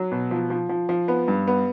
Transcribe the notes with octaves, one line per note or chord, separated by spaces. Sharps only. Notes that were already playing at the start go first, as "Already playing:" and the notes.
Already playing: F#3
B2
F3
F3
F3
F3
B3
G2
B3